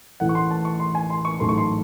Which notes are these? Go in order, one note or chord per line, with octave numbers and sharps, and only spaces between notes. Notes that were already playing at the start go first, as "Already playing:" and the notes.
A1 A2 E3 A3 F#5
C#6
C6
A5
C#6
C6
G#5
C6
C#6
A1 G#2 F#3 A3 C6
C#6
C6